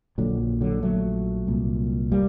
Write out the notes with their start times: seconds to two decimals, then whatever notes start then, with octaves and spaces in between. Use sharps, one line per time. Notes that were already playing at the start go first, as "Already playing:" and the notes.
0.18 A#1 A#2 D3 F#3
0.61 D3 F#3
0.83 F#3 A3
1.47 C2 A#2
2.12 G3 A#3